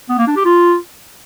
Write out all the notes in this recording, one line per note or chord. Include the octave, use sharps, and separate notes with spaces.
B3
A#3
D4
G4
F4